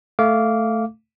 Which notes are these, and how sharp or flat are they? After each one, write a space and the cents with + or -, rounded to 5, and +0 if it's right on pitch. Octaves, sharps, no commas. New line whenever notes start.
A3 +0 F5 -5 D6 -20